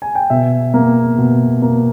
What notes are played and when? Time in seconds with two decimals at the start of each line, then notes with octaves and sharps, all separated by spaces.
0.02 G#5
0.15 G5
0.30 B2 E5
0.74 A#3
1.18 B2
1.62 A#3